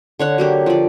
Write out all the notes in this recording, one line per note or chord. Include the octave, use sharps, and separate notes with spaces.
D3 C#5 F#5
F#3 A#3 G4
F3 D5